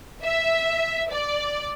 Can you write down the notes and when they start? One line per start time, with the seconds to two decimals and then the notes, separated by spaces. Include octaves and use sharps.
0.23 E5
1.10 D5